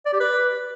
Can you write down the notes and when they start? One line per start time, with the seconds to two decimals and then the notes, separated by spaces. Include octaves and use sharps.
0.06 D5
0.13 G4
0.20 B4